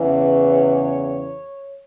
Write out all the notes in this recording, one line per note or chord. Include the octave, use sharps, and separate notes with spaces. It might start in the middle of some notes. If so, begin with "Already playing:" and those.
Already playing: E2 C#3 E3
C#5